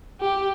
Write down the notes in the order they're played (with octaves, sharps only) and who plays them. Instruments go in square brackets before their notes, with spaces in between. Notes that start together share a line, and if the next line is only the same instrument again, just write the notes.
[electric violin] G4